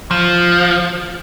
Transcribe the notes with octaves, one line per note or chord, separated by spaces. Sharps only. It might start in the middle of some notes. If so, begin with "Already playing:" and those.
F3